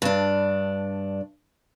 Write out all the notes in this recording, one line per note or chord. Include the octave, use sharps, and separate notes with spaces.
G2 D4